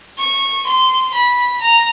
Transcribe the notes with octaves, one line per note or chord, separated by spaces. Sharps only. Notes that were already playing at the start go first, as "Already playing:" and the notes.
C#6
C6
B5
A#5